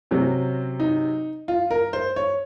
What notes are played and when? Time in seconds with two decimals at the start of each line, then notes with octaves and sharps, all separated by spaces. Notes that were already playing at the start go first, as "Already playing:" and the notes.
0.11 C3 F#3 C4 C#4
0.80 D#4
1.48 F4
1.71 A#4
1.93 C5
2.16 C#5